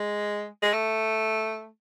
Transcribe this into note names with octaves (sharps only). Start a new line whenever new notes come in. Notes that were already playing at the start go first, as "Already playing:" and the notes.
Already playing: G#3
G#3
A3